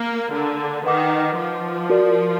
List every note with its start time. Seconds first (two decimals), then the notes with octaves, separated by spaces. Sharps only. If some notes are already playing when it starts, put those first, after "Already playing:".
Already playing: A#3 A#4 F5 A#5
0.32 D3
0.84 D#3 B4 D#5 F#5 D6
1.37 F3
1.90 F#4 A#4 D5